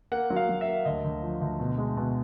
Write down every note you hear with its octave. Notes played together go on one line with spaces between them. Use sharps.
A#3 F#5
F#3
F5
F#3
E5
A#3
D2 D#5
D2
F3
D2
B2
G#3
B2